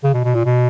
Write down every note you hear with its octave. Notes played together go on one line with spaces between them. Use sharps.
C#3
B2
B2
A#2
B2